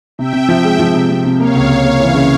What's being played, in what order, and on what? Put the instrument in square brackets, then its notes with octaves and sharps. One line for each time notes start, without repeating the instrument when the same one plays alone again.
[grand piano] C3 [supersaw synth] E5 G5
[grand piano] C3
F3
G#3
F3
C3
C3
C3
[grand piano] A#3 [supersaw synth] C#5 F5
[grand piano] C#2
A#3
A#3
[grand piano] E3 [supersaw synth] C#5 F5
[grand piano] C#3